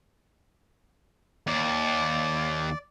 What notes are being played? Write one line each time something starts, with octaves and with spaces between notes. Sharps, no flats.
D#2 D5